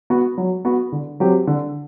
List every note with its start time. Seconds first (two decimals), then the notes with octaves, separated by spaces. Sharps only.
0.10 B3 F#4
0.38 F#3
0.65 B3 F#4
0.92 D3
1.20 F#3 C4 G4
1.47 D3